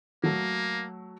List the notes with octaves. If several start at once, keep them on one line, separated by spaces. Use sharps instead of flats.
F#3 A3 A#3